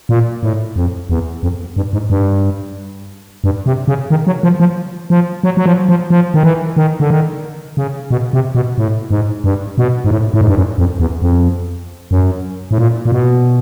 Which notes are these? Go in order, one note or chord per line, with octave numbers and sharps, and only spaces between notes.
A#2
A2
F2
E2
F2
G2
G#2
G2
G2
C3
C#3
D#3
F#3
F3
F3
F3
F#3
F#3
F3
F3
F3
D#3
E3
D#3
D3
D#3
C#3
B2
C3
B2
A2
G#2
G2
B2
G#2
A2
A2
G#2
G2
F#2
F2
E2
F2
F#2
A2
A#2
A#2
B2